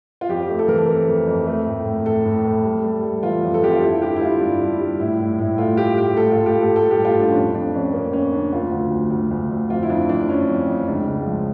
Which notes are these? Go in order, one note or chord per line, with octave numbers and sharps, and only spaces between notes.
F4
F2 G4
A3
A4
E3 A#4
A4
F2 A#4
F2
F2
A3
A2
A2
A3 A4
A2
A3
G3
G3
G3
E3 F4
F2
A4
F2 G4
F4
G2 E4
D3 G4
E4
G2 F4
G2 D4
G2
G2
A2 E4
A2
A2 E4
A3 F4
A2 G4
A2 G4
A2 A4
F4
A2
G4
A2 A4
A2 A4
G4
G3
F4
A2
D4
C#4
F2 D4
F2 D4
F2 C#4
F2 A#3
F2 C#4
D3 D4
D2 F4
D2
D2
D2
D2
D2
F2 F4
E4
F2 D4
F2 D4
F2 C#4
F2
F2
C#2 D4
C#2
F3